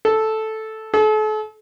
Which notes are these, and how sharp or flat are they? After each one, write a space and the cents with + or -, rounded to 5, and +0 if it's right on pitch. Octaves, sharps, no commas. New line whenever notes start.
A4 -5
A4 -40